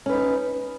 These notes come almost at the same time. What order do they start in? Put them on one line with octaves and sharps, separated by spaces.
C#4 B4 D#4